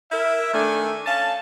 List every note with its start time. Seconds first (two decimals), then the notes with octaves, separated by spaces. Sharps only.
0.11 E4 A#4 E5
0.54 D#3 A3 D4 A4 G#5
1.07 C#4 F5 A5